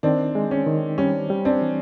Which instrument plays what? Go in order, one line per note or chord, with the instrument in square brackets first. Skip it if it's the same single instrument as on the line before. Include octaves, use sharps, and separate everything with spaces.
[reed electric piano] D#3 [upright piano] C4 D4
[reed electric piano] G#3
[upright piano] C#4
[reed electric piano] D#3
[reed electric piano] G3 [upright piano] C#4
[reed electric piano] G3
[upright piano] C4 D4
[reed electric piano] E3